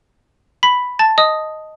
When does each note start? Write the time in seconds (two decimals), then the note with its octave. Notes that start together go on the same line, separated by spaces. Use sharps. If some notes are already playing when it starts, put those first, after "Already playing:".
0.63 B5 B6
0.99 A5 A6
1.18 D#5 D#6